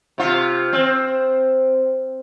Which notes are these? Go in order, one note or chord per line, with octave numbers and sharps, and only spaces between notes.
C3 F4
C4